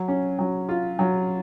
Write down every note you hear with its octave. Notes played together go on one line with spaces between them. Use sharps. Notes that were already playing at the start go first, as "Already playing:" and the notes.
Already playing: F#3
C#4
F#3
F4
F#3